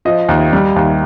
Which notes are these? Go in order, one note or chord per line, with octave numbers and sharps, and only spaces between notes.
F3 D#5
D#2
G3
D#2